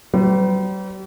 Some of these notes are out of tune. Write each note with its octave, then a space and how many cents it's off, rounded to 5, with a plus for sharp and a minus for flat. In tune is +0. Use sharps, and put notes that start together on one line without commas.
G3 -40 B4 +40